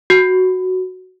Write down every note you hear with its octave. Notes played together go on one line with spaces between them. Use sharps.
F#4